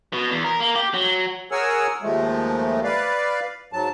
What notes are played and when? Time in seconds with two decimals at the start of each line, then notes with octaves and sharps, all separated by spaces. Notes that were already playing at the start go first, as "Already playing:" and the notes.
0.13 B2
0.30 E2
0.44 A#4
0.60 A#3
0.75 G4
0.94 F#3
1.51 G#4 A#4 C#5 F#5 G#5 E6
2.02 D#2 F3 G#3 A3
2.84 B4 D5 F5
3.73 G#2 F#3 A5